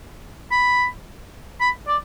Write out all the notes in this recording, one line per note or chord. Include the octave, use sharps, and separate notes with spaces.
B5
B5
D5